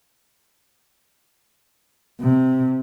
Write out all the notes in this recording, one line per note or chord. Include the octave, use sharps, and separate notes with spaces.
C3